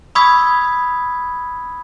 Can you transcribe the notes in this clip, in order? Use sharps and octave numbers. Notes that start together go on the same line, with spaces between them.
B5 C#6 D#6 E6 G#6 B6